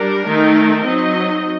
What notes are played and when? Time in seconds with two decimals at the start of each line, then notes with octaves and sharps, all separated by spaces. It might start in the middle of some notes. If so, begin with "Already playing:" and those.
Already playing: G3 D4 A#4
0.27 D#3 A3 D#4
0.85 F#3 C4 D#4 D#5